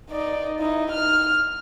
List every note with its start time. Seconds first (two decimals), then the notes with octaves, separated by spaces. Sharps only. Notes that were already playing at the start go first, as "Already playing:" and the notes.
0.10 D#4 D5
0.59 D#4 E4
0.91 F6